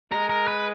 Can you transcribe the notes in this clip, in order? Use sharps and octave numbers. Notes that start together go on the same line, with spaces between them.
G#3 A#4
A#4
B4